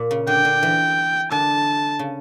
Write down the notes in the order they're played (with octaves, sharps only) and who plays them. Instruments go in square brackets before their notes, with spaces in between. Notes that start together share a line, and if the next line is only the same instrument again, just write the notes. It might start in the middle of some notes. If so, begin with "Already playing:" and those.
Already playing: [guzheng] A#2
C#3
[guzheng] D3 [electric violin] G5
[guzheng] D3
E3
[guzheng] D3 [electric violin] A5
[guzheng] C#3